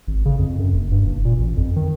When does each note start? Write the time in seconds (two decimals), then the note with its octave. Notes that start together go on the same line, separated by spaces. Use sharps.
0.07 G#1
0.25 C#3
0.39 F2
0.59 F#2
0.73 F#1
0.92 G2
1.06 F#1
1.25 A#2
1.38 A1
1.57 F2
1.76 D#3